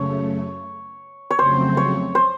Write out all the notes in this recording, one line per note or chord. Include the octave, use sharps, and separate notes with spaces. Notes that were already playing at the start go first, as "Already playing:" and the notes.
Already playing: F#2 C#3 A3 C#5
C#5
F2 C#3 F#3 A3 C4 C5
C#5
C5